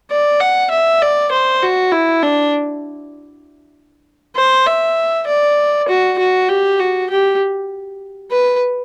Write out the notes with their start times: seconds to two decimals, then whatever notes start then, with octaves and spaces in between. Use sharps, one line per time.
0.10 D5
0.40 F#5
0.70 E5
1.01 D5
1.31 C5
1.62 F#4
1.92 E4
2.23 D4
4.36 C5
4.66 E5
5.27 D5
5.89 F#4
6.18 F#4
6.48 G4
6.79 F#4
7.10 G4
8.31 B4